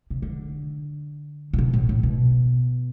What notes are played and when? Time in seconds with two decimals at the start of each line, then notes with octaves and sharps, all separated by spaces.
0.10 C3
0.22 D3
1.53 A2
1.58 B2
1.73 A2
1.89 A2
2.03 B2